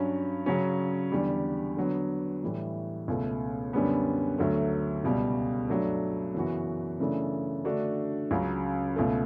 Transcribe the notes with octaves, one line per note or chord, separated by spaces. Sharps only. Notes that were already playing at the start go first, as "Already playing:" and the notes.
Already playing: G2 F#3 C#4
C#3 F#3 C#4
E2 D3 G3
D3 F#3 B3
A2 E3 G3
C#2 B2 A3
F#2 D3 G3 B3
D2 D3 F#3 A3
C#2 B2 G3
G2 F#3 A3 D4
F#2 C#3 E3 B3 F#4
F#2 C#3 E3 A3 D4
D3 A3 D4 F#4
C#2 C#3 F#3
C#2 B2 A3